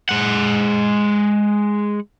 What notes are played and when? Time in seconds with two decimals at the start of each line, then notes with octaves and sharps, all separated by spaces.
0.09 G#3 F#5